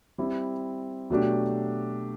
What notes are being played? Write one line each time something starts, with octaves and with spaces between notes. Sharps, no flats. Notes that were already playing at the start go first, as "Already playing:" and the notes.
G3 C4 E4
B2 F#3 A3 D4 G4